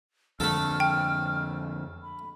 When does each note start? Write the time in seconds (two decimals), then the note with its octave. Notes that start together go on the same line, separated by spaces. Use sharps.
0.40 F2 D3 A3 A4 F6
0.80 G5
2.02 B5